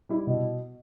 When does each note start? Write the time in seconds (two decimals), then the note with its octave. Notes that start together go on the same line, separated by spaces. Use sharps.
0.09 G3 E4
0.27 B2